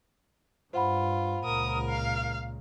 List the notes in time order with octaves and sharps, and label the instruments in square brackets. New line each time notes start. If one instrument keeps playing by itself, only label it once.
[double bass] G2 [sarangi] F4 [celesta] C5 F#5 B5
[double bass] C#2 A#2 [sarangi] A#4 [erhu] D#6
[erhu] F5